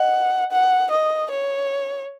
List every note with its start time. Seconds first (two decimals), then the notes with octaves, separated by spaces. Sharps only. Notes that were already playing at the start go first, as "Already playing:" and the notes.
Already playing: D#5 F#5
0.52 F#5
0.91 D#5
1.30 C#5